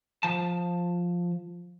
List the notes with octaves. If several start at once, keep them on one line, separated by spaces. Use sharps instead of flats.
F3 A5